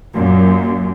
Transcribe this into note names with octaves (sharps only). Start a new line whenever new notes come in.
F#2 A#2